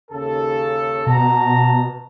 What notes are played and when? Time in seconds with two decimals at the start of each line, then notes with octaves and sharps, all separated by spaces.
0.11 D#2 C#3 A4
1.07 B2 F#4 A5 A#5